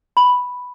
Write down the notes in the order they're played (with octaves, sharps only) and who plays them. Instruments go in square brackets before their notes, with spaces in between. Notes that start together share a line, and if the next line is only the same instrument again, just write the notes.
[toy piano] B5